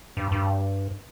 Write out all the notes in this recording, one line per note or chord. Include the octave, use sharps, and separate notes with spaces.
G2
G2